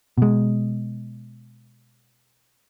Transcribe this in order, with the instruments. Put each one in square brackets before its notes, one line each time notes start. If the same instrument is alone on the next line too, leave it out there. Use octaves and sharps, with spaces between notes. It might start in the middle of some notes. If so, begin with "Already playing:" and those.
[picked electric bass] B2 G#3